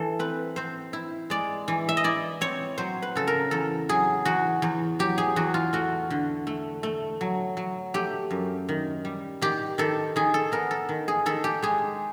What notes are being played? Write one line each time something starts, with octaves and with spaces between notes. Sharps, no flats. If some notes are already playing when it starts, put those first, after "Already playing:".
Already playing: E3 A4
C4 B4
C4 C5
E4
G#3 D5
E3
E5
D#5
E4 D5
C4 C#5
F#3 C5
B4
C#3 A4
A#4
E2 A4
F#3 G#4
E2 F#4
E2
F#3 G4
G#4
E2 F#4
F4
A3 F#4
D3
A3
A3
F#3
F#3
A3 G4
F#2
D#3
G3
D#3 G4
D#3 A4
D#3 G#4
A4
B3 A#4
A4
D#3
G#4
D#3 A4
G4
G#3 G#4